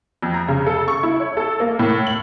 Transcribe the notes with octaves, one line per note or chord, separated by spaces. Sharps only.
F2
A#5
C#3
A4
C#6
E4
C#5
A4
A#3
A2
F#7